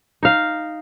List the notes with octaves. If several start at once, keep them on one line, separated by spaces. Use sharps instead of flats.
D#4 F5